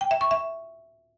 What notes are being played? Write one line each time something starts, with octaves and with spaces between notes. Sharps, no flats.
G5
E5
C#6
E5